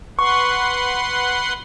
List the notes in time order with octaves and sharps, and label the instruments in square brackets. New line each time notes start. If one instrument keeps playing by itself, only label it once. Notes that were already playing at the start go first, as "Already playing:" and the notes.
[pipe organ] B4 F#5 C6 [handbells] C#6